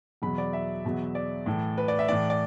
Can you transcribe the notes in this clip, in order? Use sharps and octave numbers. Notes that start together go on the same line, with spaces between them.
E2 B2 F#3 B5
D5
E5
E2 B2 F#3
D5
A2 E3
B4
D5
E5
A2 E3 D5
D5